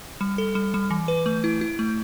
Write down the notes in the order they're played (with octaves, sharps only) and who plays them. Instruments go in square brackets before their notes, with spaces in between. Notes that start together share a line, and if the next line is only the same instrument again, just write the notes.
[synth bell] G3
A4
G3
G3
E3
B4
A3
E4
E4
A3